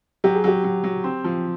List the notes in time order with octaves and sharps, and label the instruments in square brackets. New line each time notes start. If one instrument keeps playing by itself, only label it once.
[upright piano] F#3 [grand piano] G4
[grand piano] G#4
[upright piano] F#3 [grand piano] G4
[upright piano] F#3
F#3
C4
F3